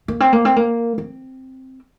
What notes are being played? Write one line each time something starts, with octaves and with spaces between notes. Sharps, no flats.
A#3
C4
A#3
C4
A#3
C4